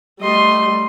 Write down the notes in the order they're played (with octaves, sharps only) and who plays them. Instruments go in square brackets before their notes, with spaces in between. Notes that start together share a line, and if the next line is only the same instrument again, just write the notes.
[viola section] G3 A3 [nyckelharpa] D#5 C6